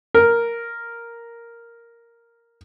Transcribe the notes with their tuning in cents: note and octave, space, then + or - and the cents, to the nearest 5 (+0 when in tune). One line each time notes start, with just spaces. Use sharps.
A#4 +0